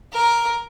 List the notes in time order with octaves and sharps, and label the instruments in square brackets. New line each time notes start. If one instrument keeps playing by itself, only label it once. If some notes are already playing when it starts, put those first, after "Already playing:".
[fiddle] A#4